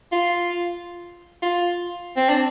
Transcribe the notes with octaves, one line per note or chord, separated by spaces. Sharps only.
F4
F4
C4
D4